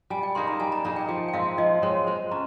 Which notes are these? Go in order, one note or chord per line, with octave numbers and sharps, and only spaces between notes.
G3 G#5
G5
A#3 D#4 G#4 C6
A#5
G3 G#5
A#5
A#3 D#4 G#4 A#5
G5
F3 G5
G5
G#3 C4 F5
F3 D#5
G#3 C4 C#5
G#3 C5
C#4 A#5